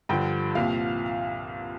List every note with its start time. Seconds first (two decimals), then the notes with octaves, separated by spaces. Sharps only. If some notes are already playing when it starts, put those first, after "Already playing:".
0.09 G2 D3 F3 G5
0.55 C2 A#2 F3 F5